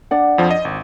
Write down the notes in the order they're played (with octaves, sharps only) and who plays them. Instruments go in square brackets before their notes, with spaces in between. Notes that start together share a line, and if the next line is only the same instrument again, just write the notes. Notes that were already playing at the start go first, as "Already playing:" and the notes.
[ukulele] D4 D5 F#5
[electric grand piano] F2 F3
D#5
G#1